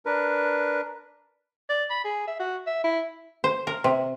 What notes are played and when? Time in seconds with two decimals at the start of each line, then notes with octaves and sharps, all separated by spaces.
0.06 D4 A#4 B4
1.69 D5
1.90 B5
2.04 G#4
2.27 E5
2.40 F#4
2.67 E5
2.84 E4
3.44 C5
3.67 A#4
3.84 C3